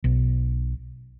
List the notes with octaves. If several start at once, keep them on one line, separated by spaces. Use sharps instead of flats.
B1